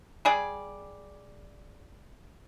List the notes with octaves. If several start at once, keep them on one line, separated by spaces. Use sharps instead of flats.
G3 G#4 D5